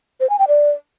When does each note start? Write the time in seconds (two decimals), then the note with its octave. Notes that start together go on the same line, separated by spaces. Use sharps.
0.20 C5
0.30 G#5
0.39 G5
0.48 D5